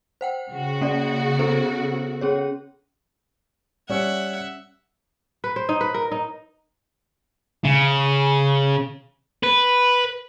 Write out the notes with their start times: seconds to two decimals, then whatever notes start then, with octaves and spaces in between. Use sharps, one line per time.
0.21 C5 F#5 G5
0.50 C#3 F#4
0.81 A#3 C#4 D5
1.39 B3 A4 C5
2.21 C#4 G#4 C#5
3.90 G3 C#4 E5 F#5
5.44 B4
5.56 C5
5.69 D#4
5.81 B4
5.94 A#4
6.12 D#4
7.64 C#3
9.43 B4